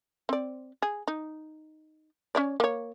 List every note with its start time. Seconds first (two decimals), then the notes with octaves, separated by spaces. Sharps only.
0.29 C4 D5
0.82 G#4
1.08 D#4
2.35 C#4 C#5 D5
2.60 A#3 C#5